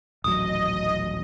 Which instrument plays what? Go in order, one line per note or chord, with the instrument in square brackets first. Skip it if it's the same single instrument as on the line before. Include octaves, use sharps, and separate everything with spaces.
[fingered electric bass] D#1 A1 F#3 [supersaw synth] D#5 [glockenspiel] D#6